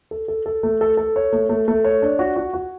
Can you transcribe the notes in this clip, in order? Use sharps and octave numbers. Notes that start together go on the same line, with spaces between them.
A4
A4
A4
A3
A4
A4
C#5
A3
A3
A3
C#5
D4
F#4
F#4
F#4